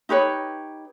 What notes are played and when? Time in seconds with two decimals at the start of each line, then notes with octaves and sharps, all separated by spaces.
0.09 D#4 G4 B4 C#5